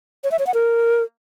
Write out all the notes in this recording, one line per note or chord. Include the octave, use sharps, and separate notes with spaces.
C#5
E5
C#5
F#5
A#4